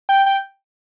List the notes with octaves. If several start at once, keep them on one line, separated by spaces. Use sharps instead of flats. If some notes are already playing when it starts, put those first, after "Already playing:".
G5
G5